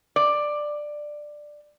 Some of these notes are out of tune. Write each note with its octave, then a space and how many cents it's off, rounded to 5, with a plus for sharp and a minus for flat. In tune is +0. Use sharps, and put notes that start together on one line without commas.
D5 +10